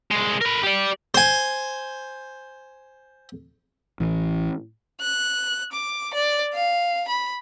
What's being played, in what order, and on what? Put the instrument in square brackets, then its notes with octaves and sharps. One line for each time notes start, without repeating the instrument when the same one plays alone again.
[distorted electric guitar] C2 G#3
A#4 B4
G4 D5
[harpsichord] C5 G#5
[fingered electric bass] A1 E3
[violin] F#6
D6
D5
F5
B5